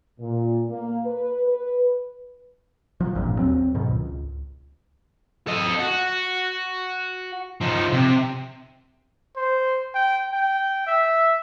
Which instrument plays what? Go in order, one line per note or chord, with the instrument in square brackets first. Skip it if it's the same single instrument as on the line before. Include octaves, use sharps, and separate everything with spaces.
[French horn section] A#2
A#3
B4
B4
[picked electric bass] F3 F#3
G#1 E2 G2 A#2
D#2 F#3 C4
G#2 B2 D#3
C#2
[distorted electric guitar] A4 D#5
F#4
F3 D#4
C3
[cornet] C5
G5
G5
E5